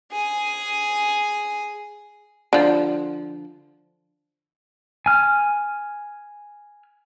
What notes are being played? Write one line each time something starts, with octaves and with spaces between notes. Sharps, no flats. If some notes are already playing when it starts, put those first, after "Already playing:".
G#4 G#5
D3 F3
G#5 F6